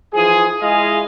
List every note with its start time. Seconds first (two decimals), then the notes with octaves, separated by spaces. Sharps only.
0.14 E3 F3 F4 G#4
0.60 G#3 E4 F4 G#4 D#5 F5